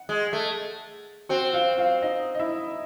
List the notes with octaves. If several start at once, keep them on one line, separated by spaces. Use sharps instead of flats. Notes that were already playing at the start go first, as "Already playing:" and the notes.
Already playing: F#5
G#3
A3
C4 F#4 F#5
F4 F5
F4 F5
D#4 D#5
D#5
E4 E5